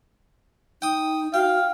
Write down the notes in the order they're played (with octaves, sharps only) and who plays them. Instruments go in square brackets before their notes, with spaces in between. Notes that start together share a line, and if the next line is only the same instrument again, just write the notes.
[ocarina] D#4 [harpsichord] G5 D#6
[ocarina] F#4 [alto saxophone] F5 [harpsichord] G5